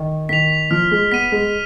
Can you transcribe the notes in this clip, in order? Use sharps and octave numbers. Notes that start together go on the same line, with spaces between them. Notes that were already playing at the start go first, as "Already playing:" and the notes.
Already playing: D#3
D#3 B6 F7
F3 F6
G#3
B3 B6 D#7
G#3